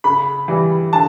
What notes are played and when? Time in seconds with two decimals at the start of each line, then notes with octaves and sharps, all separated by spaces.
0.04 C#3 B5
0.48 E3 G3
0.93 D3 A5